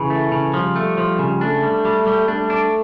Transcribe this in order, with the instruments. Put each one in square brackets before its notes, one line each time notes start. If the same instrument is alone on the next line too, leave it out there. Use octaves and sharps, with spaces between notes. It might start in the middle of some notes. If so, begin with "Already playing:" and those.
Already playing: [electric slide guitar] C#3 [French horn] E3
[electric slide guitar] A3
C#3
[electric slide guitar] F3 [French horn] G3
[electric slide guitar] A3
F3
C#3
[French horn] A3 [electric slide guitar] D4
[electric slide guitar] G3
G3
G3
[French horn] A3 [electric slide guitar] D4
[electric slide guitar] D4